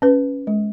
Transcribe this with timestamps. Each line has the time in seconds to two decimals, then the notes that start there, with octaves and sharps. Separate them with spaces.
0.02 C#4 B4
0.47 G#3